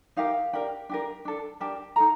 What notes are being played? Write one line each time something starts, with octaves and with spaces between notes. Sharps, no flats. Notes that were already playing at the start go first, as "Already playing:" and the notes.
D#4 G4 A#4 F5
D4 G4 A#4 G5
D4 G4 A#4
D4 A4
D4 G4 A#4 A5
D#4 A4 A#5